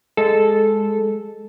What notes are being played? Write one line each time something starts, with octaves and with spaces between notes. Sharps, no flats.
G#3 A4